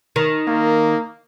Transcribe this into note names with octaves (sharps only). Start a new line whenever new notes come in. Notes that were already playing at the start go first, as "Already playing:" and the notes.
D#3
A#3